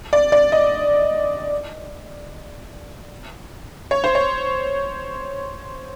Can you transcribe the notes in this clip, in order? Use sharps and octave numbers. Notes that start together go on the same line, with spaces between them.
D5
D5
D#5
C#5
C5
C#5